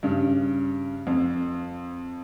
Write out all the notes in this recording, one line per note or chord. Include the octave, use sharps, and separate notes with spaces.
G2 C#3
F2